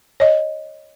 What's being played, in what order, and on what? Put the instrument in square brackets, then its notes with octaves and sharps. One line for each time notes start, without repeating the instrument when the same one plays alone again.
[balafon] C#5 D#5